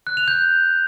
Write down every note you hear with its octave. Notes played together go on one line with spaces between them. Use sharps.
F#6
F7
G6